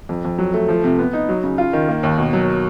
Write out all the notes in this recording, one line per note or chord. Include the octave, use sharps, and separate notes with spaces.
F2
F2
F#3
A3
F3
C3
B3
D#4
F#3
C#3
F4
D#3
A#3
D#2
B2
F#3